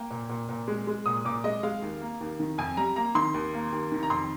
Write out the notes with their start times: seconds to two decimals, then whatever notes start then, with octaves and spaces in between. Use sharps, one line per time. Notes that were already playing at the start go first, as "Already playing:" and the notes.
Already playing: A#3 G5
0.11 A#2
0.29 A#2
0.49 A#2
0.68 G#3
0.87 G#3
1.06 A#2 D#6
1.25 A#2 D6
1.44 G#3 D#5
1.63 G#3 F5
1.82 D#2
2.01 A#3
2.21 D#2
2.40 D#3
2.58 F2 G#5
2.77 G3 A#5
2.96 A#3 A#5
3.15 D#3 C6
3.34 D#2
3.54 A#3
3.72 D#2
3.92 D#3
4.03 A#5
4.10 F2 C6